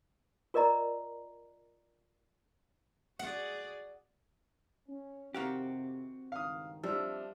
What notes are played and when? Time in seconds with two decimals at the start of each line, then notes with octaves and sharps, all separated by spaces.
0.54 F4 A#4 D5 D#5 A#5
3.19 F#4 G#4 D5 F#5
4.89 C#4
5.34 F2 C3 D#3 C4 F#4 G4 F5 F#5
6.32 C#2 G2 D#3 F5 D#6
6.83 F3 G3 D4 E5